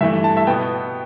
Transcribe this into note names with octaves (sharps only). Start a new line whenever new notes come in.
G2 E3 A3 E5
A5
E5
B2 B3 G5